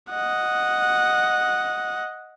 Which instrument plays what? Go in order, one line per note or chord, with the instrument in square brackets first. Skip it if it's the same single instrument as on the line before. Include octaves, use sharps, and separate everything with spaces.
[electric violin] D#5 F#5